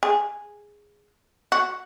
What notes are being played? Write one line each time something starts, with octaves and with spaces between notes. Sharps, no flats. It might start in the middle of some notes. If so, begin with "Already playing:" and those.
G#4
F#4